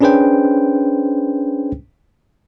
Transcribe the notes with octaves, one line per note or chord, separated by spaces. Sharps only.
C#4 D4 G#4 B4 C5 G5